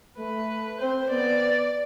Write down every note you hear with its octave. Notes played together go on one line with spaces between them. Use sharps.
A3 B4
C4 C5
B3 D5